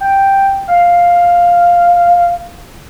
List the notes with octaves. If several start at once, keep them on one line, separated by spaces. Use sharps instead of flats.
G5
F5